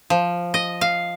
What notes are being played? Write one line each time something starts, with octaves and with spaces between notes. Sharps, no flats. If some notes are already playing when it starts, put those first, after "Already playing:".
F3
D#5
F5